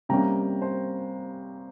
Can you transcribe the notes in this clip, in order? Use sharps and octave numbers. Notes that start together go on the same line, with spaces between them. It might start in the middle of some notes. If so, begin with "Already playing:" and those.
C3 G3 A#3 C#4 G5 A#5
C5